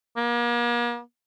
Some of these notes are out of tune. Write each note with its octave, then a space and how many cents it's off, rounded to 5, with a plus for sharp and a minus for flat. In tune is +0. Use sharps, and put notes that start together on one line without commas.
A#3 +40